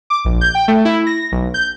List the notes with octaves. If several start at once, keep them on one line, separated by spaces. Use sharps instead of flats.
D6
A#1
G6
G5
A3
E4
A#6
B1
G6